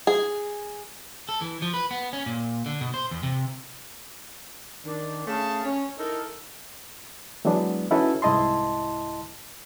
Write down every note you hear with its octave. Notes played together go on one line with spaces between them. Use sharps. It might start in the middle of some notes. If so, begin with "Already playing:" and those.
G#4
A4
E3
F3
B4
B3
C#4
A#2
D3
B2
C5
E2
C3
D#3 D4
A3 C#4 G#4 F5 A5
C#4
D#4 E4 A4 A#4
E3 F#3 G#3 B3 D4
C#4 D#4 E4 F#4 A4 B4
C2 G#2 E4 D#5 A5 C6